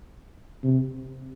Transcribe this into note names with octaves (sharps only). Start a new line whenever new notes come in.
C3